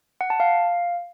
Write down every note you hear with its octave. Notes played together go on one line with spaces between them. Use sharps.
F#5
A5
F5